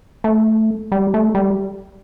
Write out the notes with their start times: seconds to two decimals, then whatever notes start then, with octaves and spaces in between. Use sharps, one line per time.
0.24 A3
0.92 G3
1.14 A3
1.35 G3